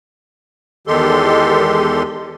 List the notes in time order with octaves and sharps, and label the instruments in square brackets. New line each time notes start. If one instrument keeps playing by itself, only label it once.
[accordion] E2 D#3 G#3 G4 A4 C6